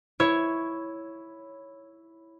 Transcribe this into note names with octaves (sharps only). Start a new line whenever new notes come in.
E4 C#5